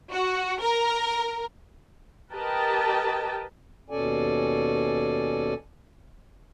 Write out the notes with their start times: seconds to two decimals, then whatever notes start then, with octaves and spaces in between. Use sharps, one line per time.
0.11 F#4
0.60 A#4
2.33 G4 A#4 B4 D#5 G5 A5
3.90 D#2 B2 C#4 A4 D5 G#5